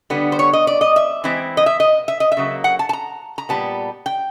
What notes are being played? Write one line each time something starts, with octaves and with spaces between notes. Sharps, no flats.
D3 G3 B3
C5
C#5
D#5
D5
D#5
E5
E3 G#3 C4 E4
D#5
E5
D#5
E5
D#5
E5
C#3 F#3 A#3
F#5
A5
A5
A#5
A#5
A#2 G3 B3 A5
G5